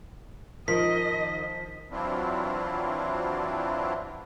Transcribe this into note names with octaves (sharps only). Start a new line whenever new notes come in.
D#3 F3 D#5 B6
E3 F#3 C4 D4 E4 F4